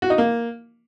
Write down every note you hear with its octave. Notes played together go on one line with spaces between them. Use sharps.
F#4
D#4
A#3